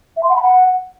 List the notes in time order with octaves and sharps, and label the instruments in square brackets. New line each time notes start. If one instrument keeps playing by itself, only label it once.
[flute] E5
C6
F#5
B5
F#5